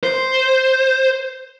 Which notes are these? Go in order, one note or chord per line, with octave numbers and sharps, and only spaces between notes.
C5